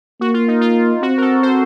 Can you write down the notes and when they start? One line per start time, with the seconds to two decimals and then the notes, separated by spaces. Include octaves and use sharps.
0.21 A#3 F#4
0.34 F4
0.48 D#4
0.61 F4
1.02 C4 F#4
1.18 A#4
1.22 A4
1.43 C5